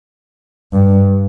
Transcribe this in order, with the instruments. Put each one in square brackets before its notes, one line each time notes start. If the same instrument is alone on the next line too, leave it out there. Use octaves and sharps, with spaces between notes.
[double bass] G2